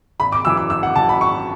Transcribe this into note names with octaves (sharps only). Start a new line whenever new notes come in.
G#1 B5
D6
F#2 E3 E6
E6
G#1 E6
F#5
F#2 E3 A5
B5
G#1 C#6